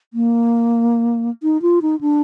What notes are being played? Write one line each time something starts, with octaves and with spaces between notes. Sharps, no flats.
A#3
D#4
F4
D#4
D4